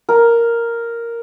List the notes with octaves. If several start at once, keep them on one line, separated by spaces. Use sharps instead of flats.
A#4